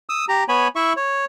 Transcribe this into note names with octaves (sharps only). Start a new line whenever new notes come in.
D#6 E6
G4 A#5
B3 C#5 G#5 B5
E4 E5 C#6
C#5